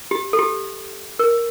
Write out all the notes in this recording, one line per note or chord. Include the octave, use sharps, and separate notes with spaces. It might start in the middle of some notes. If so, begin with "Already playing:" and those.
G4
A4
G4
A#4